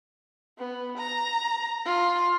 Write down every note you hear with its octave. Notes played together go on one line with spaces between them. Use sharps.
B3
A#5
F4